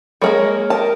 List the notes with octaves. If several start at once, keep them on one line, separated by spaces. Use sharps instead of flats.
G3 G#3 A#3 A#4 C#5
G4 A#4 D#5 A5